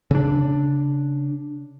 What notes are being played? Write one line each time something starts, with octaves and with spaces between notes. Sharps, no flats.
C#3 D4